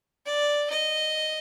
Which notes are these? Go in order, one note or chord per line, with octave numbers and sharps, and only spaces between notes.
D5
D#5